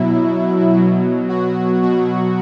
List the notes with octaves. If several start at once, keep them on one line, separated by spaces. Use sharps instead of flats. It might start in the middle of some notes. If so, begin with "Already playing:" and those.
Already playing: B2 F#3 E4
B2 F#3
F#4
B2 F#3 F#4